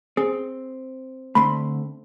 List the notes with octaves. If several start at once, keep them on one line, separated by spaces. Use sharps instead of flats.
C4 G#4
D3 A3 C4 B5 C6